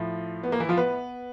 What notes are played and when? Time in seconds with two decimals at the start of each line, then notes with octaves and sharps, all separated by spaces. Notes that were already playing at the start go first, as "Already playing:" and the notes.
Already playing: A2 F3
0.43 B3
0.52 A#3
0.60 E3 E4
0.69 F3 F4
0.77 B3 B4